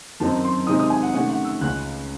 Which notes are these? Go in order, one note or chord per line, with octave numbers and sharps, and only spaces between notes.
F#2 D#3 F#3 C4 D#4 A5
C6
C3 D#3 G#3 C4 D#4 D#6
D#6
G#5
F#5
C3 D#3 A3 C#4 F#5
F#5
E6
C#2 C#3 G#3 C#4 F#6